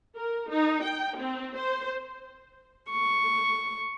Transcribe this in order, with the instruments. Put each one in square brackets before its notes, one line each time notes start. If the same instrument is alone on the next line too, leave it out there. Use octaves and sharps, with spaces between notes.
[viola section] A#4
D#4
G5
C4
C5
[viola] C#6